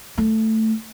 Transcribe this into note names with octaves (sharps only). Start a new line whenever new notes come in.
A3